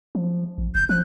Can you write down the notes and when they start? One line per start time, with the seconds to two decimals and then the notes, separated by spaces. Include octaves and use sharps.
0.15 F3
0.58 A1
0.75 F#1 G6
0.89 F3 F#6